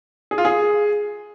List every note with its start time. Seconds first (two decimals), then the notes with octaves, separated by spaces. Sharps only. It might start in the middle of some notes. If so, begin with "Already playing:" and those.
0.31 G#4
0.38 F4
0.45 G#4